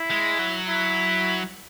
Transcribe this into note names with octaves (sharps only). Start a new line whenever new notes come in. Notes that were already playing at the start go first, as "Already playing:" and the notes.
Already playing: E4
G#3
F#3
E4